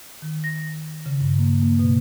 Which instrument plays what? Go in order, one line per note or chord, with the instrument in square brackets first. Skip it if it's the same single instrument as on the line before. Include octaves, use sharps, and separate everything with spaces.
[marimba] D#3
A#6
C#3
G2
A#3
A#3
B2